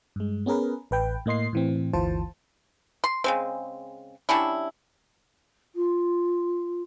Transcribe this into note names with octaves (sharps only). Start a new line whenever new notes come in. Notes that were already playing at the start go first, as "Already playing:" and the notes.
G2 G#3
B3 C#4 G#4 A#4 B4
A1 B4 G5
A2 A#3 D#5 C6 C7
A2 E3 C4
G1 D2 E3 F4 C5 A5
C6
C#3 G#3 C4
G3 C#4 D4 E4
F4